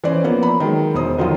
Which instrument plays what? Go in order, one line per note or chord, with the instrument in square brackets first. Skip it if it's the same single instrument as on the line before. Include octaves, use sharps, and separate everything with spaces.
[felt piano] E3 C#4 C5 D5
F3 A#3 B3 C#4
B5
D#3 F#3 G#3
E1 C5 D#6
D3 D#3 F3 F#3 F4